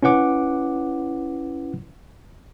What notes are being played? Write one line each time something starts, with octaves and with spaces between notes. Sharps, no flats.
C#4 E4 B4 F#5 D6